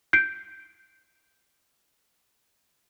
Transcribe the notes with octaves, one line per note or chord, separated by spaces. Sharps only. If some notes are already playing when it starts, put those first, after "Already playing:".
G6 C7 D7